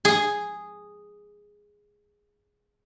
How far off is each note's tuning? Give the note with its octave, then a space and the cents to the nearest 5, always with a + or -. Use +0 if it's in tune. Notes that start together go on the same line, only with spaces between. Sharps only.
G#4 -5